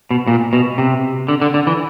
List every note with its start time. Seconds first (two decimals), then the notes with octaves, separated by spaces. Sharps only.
0.11 B2
0.27 A#2
0.53 B2
0.78 C3
1.28 D3
1.41 D3
1.54 D3
1.67 E3